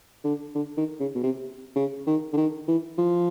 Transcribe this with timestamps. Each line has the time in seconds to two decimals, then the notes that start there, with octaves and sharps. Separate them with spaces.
0.24 D3
0.55 D3
0.77 D#3
1.00 C#3
1.15 B2
1.23 C3
1.76 C#3
2.07 D#3
2.33 D3
2.37 D#3
2.68 E3
2.98 F3